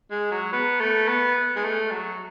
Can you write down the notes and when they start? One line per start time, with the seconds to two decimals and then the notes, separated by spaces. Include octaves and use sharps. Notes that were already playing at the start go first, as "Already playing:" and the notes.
0.11 G#3
0.31 F#3
0.53 B3
0.80 A3
1.08 B3
1.56 G#3
1.64 A3
1.91 F#3